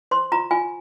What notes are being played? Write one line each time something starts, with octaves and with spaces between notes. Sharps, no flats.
C5 C6
F4 A#5
F4 G#5